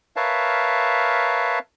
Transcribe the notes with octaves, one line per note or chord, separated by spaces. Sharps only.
A#4 B4 C#5 E5 F5 A5